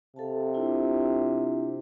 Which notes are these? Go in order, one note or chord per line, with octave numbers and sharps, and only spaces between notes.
C3 A4 F5 A5
D4 E4 F4